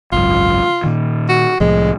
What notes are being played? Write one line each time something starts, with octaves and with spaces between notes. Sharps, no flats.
G#1 C#2 F#2 F4
A#2 D#3
F#4
C2 A2 F3 G#3